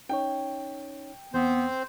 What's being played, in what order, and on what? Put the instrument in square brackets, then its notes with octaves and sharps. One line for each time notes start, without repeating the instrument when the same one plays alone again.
[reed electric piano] C#4 D#4 C#5 [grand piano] G5
[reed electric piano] E2 [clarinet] B3 [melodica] C4 C5